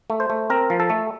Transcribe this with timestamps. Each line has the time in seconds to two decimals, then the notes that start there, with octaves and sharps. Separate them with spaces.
0.10 A3
0.20 C5
0.30 A3
0.50 C4 A#4
0.70 F3
0.80 A4
0.90 A3